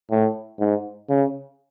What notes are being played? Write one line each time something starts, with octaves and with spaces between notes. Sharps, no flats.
A2
G#2
C#3